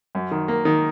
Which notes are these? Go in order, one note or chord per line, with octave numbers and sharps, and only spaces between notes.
F#2
D#3
A#3
D#3